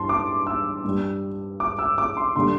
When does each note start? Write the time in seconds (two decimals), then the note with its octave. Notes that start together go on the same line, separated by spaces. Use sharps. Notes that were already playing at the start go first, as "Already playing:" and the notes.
Already playing: G2 E3 A5 C6
0.09 D6
0.47 E6
0.85 G2 G3
1.60 D6
1.79 E6
1.98 D6
2.17 C6
2.36 D3 G3 C6